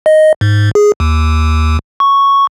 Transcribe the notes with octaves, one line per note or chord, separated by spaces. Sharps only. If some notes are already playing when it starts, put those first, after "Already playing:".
D#5
G#2
G#4
D#2
C#6